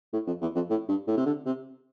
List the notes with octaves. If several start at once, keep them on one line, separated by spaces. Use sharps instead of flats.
A2
F2
E2
F2
A2
G2
A2
C3
D3
C3